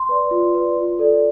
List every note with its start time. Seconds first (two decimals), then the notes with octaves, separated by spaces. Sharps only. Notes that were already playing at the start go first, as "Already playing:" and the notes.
Already playing: C6
0.09 B4 D5
0.31 F4
0.54 B4 D5
0.77 F4
0.99 A4 D5